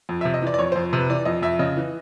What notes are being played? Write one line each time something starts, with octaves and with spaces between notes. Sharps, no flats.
F2
E5
C3
D#5
E3 D5
D5
F2 C#5
F2 C5
C3 B4
E3 D5
F2 D#5
F2 E5
C#3 D#5
E3